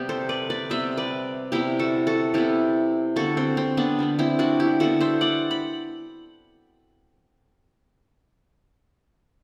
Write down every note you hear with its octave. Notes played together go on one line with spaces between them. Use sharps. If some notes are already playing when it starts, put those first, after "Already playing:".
Already playing: C3 G3 B3 G4
A4 C5
B4 D5
B4 D5
C3 G3 B3 C5 E5
B4 D5
C3 G3 B3 E4 G4
F#4 A4
F#4 A4
C3 G3 B3 E4 G4
D3 G3 B3 F#4 A4
C4
C4
B3 D4
D3 G3 B3
C4 E4
D4 F#4
E4 G4
D3 G3 B3 F#4 A4
C5 E5
D5 F#5
B5